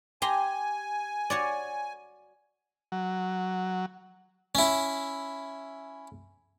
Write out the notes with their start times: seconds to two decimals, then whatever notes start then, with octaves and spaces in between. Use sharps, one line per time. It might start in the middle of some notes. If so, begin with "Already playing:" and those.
0.22 G4 G#5 A#5 C6
1.30 F#4 C#5 D5
2.92 F#3
4.55 C#4 E4